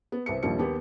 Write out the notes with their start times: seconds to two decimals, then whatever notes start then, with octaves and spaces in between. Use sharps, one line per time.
0.12 B3
0.26 C2 B4 C5 C#7
0.43 A#1 D#2 F3 G3 D5 C#7
0.59 D#2 B3 G4